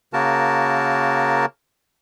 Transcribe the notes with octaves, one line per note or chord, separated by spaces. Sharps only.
C#3 A#3 F#4 A#4 A5